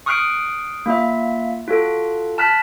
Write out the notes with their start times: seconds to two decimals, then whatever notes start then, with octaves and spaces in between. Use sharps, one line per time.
0.06 C#6 D#6 F6 F#6 C7 D7
0.86 A#3 F4 E5
1.68 F4 F#4 A4 F#6
2.38 A5 F6 F#6 B6